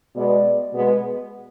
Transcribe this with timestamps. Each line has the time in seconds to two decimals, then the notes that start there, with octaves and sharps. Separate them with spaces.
0.15 B2 G#3 B3 D5
0.72 B2 G#3 B3